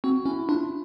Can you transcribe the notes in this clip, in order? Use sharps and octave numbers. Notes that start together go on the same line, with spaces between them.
C4 F#4
C#4 E4
D4 F4